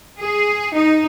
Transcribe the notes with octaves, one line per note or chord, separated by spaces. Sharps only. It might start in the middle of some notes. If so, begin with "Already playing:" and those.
G#4
D#4